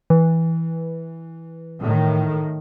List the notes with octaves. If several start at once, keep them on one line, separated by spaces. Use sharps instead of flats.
E3
A2 D#3